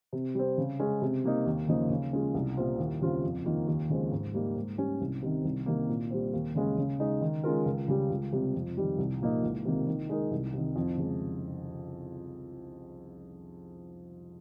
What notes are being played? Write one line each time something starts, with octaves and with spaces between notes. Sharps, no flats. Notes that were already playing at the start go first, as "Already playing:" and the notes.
C3
G3 C4
C#3
G#3 C#4 G#4
C3
G3 A#3 D#4
D#2
C#3 F3 A#3 D#4
C#3
G#3 C#4 F4 G#4
C2
A#2 G3 C4 F4
D#2
C#3 G3 C4 F4
F2
D#3 A#3 F4
D#2
C#3 F3 G#3 C4
G#2
G3 A#3 D#4
G#2
G3 C#4
C2
C3 D#3
C2
C3 D#3 A#3
A#2
G3 C4
D#2
C#3 G#3 C#4
C#3
G#3 D#4
D#3
G#3 C#4 F4 A#4
C#2
C#3 G3
C#2
C3 G3
F2
D#3 G3
C2
A#2 F3 A#3 D#4
C#2
C3 D#3 A#3
D#3
G#3 D#4 A#4
C2
C3 D#3
F2
C#3 G#3